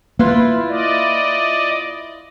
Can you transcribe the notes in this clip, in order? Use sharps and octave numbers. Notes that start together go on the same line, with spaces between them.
A#3 E4 F4 B4
D5 D#5